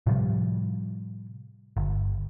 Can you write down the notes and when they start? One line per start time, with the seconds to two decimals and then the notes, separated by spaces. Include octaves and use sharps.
0.07 A2 C3 F3 G3
1.77 G1